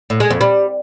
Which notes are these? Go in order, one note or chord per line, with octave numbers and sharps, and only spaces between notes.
A2
G#3
F2
G3